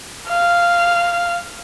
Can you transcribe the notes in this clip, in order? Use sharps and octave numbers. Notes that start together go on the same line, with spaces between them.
F5